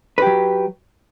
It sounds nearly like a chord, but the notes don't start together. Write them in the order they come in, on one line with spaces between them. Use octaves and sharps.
B4 G4 F#3